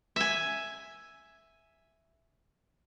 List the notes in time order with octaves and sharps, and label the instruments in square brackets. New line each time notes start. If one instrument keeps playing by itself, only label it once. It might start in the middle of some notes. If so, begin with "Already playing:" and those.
[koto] E5 G#5